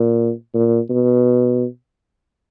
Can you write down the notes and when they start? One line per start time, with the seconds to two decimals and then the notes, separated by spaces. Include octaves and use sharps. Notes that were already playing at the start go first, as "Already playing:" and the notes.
Already playing: A#2
0.54 A#2
0.90 B2